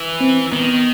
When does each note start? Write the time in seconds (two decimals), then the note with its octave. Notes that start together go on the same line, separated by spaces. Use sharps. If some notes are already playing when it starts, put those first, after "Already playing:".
Already playing: E3
0.20 C4
0.52 D#3 B3